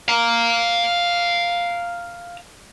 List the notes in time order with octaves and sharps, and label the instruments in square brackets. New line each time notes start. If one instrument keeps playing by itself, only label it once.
[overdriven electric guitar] F5 A#5